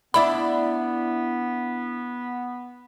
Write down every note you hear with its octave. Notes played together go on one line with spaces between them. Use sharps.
B3 D4 E4 D5 B5